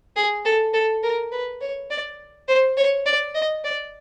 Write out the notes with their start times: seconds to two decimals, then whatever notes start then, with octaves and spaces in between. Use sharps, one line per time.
0.16 G#4
0.45 A4
0.74 A4
1.03 A#4
1.32 B4
1.61 C#5
1.90 D5
2.48 C5
2.77 C#5
3.06 D5
3.35 D#5
3.64 D5